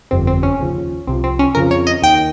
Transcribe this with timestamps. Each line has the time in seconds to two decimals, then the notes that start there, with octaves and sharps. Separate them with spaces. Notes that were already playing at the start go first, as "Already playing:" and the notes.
0.11 G1 F2 C3 C4
0.27 C4
0.43 C#4
0.60 D#2 C#3 F3
1.07 C2 C3 F3 C4
1.24 C4
1.39 C#4
1.55 F2 C#3 F3 A#4
1.71 C#5
1.87 D#5
2.02 D#2 D#3 G5